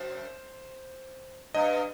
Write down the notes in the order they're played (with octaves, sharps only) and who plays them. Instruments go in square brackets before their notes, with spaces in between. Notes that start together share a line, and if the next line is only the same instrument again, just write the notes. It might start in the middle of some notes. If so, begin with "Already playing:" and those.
Already playing: [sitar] F#2 [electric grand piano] C5
[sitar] G2 [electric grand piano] D#5